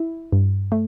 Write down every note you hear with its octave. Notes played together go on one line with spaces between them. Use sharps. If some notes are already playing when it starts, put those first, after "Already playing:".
Already playing: E4
G2
A3